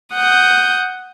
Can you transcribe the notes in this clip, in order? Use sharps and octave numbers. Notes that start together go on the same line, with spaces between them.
F#5 D#6 G6